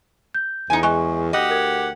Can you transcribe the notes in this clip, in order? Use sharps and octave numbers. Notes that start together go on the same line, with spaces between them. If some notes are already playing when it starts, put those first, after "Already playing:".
G6
E2 D#4 G#5
G#3 G#5 C#6
D2 G4 D#5 F#5
A#4 G#6